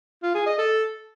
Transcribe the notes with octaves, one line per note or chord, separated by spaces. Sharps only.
F4
G#4
D#5
A4